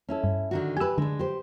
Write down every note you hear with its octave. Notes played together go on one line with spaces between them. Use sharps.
C#4 E4 A4
G2
D3 D#3 F#4
G4 B4 G#5 E6
D3 G#3 D4
G4 C5